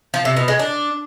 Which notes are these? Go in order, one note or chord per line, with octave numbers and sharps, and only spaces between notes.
F3
C3
B2
G#3
D4